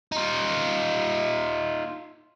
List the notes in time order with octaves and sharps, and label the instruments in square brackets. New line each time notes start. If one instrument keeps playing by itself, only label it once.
[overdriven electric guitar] D#4 F4